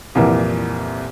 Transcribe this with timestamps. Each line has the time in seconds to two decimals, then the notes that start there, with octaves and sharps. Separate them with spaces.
0.15 C2 F2 A#2 E3